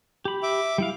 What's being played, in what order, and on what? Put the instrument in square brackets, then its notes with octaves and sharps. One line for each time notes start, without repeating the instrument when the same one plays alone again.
[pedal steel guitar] G4 B5
[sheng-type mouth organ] E5 D6
[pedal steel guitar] G3 E4 F5